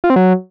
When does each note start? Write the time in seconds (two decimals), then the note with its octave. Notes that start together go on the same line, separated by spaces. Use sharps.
0.04 F4
0.10 C4
0.16 F#3